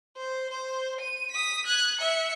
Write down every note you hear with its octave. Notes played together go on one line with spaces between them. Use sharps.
C5
C5
D#7
D#6 B6
F#6 G#6
E5 C#7